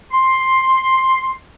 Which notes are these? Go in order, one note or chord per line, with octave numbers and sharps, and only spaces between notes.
C6